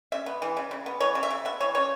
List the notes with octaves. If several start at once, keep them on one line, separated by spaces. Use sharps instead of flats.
C#3 E5
B3
E3
C#3
C#3
B3
E3 C#5
C#3
E5
C#3
B3 E5
E3 C#5
C#3 C#5